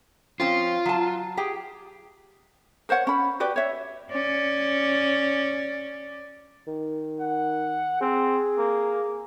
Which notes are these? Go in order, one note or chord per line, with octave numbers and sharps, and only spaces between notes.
F3 C4 C#4 F4
F#3 A5
G4 G#4 G5
A#4 C5 C#5 F#5
C#4 B5
F#4 G4 B4 D5
C#5 E5
C#4 D5
D#3
F#5
C4 G#4
A#3